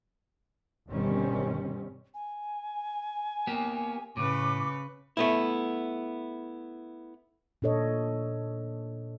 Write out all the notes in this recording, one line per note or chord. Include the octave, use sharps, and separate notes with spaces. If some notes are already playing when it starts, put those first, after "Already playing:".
G1 B2 D#3 G3 C4 C#4
G#5
A#3 B3 G4
A2 C#3 B4 D6
A3 B3 E4
A#2 D4 A4 C#5 D#5